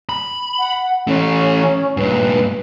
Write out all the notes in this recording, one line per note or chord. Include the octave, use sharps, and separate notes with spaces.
B5
F#5
E3 A3 C#4
G2 A#2 B4